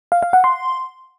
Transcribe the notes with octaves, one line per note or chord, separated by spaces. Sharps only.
F5
F5
F#5
C6